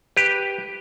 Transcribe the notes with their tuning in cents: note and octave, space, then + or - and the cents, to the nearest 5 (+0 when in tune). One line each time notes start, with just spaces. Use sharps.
G4 +0 B4 +0